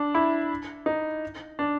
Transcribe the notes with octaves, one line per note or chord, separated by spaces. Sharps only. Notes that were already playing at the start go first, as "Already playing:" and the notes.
Already playing: D4
E4
D#4
D4